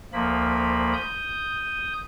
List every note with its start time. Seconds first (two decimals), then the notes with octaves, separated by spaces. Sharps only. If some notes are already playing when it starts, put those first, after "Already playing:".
0.13 D2 F3 A#3 B5
0.94 D#6 G6